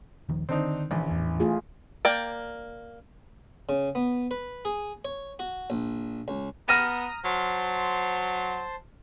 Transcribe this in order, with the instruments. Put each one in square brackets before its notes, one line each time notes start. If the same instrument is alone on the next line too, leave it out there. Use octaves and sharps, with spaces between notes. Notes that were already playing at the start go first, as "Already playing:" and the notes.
[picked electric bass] D#1 D#3 F3
[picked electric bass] D3 D#3 [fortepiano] C4 D4 D#4
[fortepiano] A#1 [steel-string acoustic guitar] E3 C#4
[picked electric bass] E2 A2
[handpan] A3 F4 G#4
[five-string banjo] A#3 D5 G5
[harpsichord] C#3
B3
B4
G#4
C#5
F#4
A#1
C#2
[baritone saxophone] B3 [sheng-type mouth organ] A#5 D#6 [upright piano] F6 A#6 D#7
[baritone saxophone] F#3 [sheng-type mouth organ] C5 A5 C6